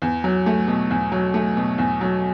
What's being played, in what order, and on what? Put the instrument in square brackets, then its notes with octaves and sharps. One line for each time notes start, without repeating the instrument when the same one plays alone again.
[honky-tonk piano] E2
F#3
A3
B2
E2
F#3
A3
B2
E2
F#3